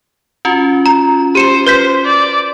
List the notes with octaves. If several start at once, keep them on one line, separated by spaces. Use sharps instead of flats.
C#4 F4 F#4
A#5
G4 C5 C#7 E7
B4 C5 G6 B6
D5